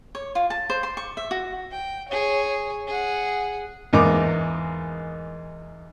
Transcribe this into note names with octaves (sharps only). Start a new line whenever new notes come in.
C#5
F4
A5
C5
C6
C#6
E5
F#4
G5
G#4 C#5
G#4 F#5
E2 G#2 A#3 D#4 D6